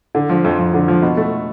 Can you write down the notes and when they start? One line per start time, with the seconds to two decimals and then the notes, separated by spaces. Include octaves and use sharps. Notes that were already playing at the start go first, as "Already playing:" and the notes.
0.15 D3
0.29 F3
0.44 F2
0.58 F2
0.74 D3
0.88 F3
1.02 B2
1.17 A3